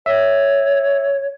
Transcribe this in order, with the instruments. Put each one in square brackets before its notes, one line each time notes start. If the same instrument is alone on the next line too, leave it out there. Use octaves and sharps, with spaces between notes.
[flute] C#5 [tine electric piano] E5